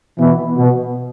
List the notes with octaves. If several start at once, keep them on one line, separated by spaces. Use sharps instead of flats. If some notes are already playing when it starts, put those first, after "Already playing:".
B2 E3
B2